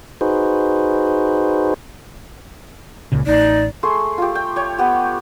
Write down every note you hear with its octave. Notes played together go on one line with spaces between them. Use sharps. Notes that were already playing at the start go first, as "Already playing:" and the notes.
D#4 F#4 G#4 B4 C5
C#2 A#2 C#3
A1 D#4 D5
A3 G#4 C6
F4 G4
G5
C#5 G5
B3 G4